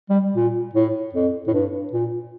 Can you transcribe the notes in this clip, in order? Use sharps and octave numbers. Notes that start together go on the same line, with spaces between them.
G3
A#2
A2
F2
A2
G2
A#2